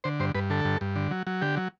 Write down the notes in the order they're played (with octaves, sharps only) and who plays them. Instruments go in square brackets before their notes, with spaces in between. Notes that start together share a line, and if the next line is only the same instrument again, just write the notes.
[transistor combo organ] D3 C5
G2 C5
G2 B4
D3 A4
G2
G2
D3
F#3
F#3
D3 G4
F#3